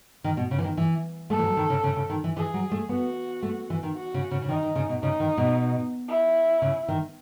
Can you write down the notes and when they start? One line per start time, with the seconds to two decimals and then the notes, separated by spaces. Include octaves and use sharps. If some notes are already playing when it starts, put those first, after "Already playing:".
0.24 D#3
0.37 B2
0.51 C#3
0.58 E3
0.64 D#3
0.77 E3
1.30 A3 A4
1.39 E3
1.44 F#3
1.57 D#3
1.70 C#3
1.84 C#3
1.96 C#3
2.10 D#3
2.24 E3
2.37 E3 G#4
2.54 F#3
2.71 A3
2.89 B3 F#4
3.43 A3
3.70 E3
3.83 D#3
3.96 F#4
4.14 C#3
4.31 C#3
4.42 C#3
4.49 D#3 D#4
4.63 D#3
4.75 C#3
4.89 B2
5.02 C#3 D#4
5.20 D#3
5.37 B2
6.09 E4
6.62 C#3
6.88 D#3